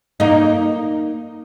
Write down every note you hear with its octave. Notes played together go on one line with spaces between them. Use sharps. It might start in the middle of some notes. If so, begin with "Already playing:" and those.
A#3 D#4